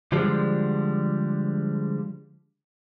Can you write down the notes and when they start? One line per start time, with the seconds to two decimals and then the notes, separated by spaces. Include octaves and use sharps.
0.12 D3 F3 G3 G#3